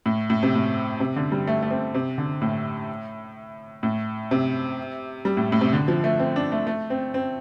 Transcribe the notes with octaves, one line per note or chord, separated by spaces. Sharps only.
A2
A2
C3
A2
C3
D3
G3
A3
A3
C4
C3
D3
A2
A2
C3
G3
A2
A2
C3
D3
F3
A3
C4
D4
A3
A3
C4
C4